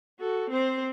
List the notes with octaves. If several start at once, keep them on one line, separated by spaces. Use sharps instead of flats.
F#4 A4
C4 C5